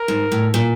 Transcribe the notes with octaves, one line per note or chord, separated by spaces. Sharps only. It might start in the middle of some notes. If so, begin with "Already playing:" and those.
Already playing: A#4
G#2
A2
A#2